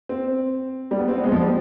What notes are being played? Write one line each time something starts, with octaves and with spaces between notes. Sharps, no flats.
C4
G3
B3
C4
B3
G#3
F3
G3